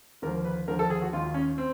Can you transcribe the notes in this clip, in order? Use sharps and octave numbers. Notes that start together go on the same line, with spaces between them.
D#2 D3 F3 A#4
B4
D#2 D3 F3 A#4
A4
G#4
F#4
D#2 D#3 F4
C#4
C4